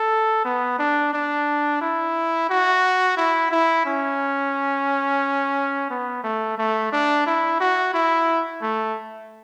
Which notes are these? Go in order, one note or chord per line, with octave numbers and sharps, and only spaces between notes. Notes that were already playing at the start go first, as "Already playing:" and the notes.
Already playing: A4
B3
D4
D4
E4
F#4
E4
E4
C#4
B3
A3
A3
D4
E4
F#4
E4
A3